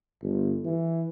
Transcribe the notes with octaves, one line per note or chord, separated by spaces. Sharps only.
G1
E3